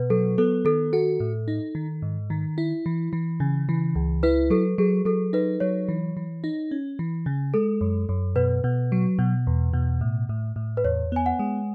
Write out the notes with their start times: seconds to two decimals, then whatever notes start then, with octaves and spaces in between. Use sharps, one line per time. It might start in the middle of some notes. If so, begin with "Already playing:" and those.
Already playing: B2 B4
0.10 F#3 A4
0.38 B3 A4
0.65 D#3 A4
0.93 F#4 A4
1.20 A2
1.48 D#4
1.75 D#3
2.02 G#2
2.30 D#3
2.58 E4
2.86 E3
3.13 E3
3.40 C#3
3.69 E3
3.95 C#2
4.23 E4 B4
4.50 F#3 A4
4.78 F#3 G#4
5.05 F#3 A4
5.33 D#4 B4
5.60 F#3 C#5
5.88 E3
6.17 E3
6.44 D#4
6.71 C#4
6.99 E3
7.26 C#3
7.54 G#3 A4
7.81 F#2
8.09 F#2
8.36 B2 B4
8.64 B2
8.92 F#3
9.19 B2
9.47 E2
9.73 B2
10.01 A2
10.29 A2
10.56 A2
10.77 B4
10.85 E2 C#5
11.12 B3 G#5
11.26 F#5
11.39 G#3